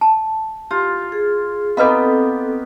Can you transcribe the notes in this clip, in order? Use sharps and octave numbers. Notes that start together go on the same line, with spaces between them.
A5
F4 G4
G#4
B3 C4 D#4 G4 A4 B4 D#5 F5